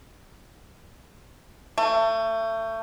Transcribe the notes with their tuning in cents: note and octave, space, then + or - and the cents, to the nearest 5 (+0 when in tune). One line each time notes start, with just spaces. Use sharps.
A3 +30